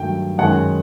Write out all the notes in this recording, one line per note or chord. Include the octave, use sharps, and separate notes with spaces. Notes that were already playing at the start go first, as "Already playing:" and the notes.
Already playing: G2 D#3 F#3 A3 G5
F#2 D#3 G#3 F#5 G#5